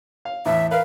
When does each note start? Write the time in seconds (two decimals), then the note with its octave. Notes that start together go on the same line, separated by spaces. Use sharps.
0.25 F5
0.46 E2 A2 E5
0.71 A#4 B4 F5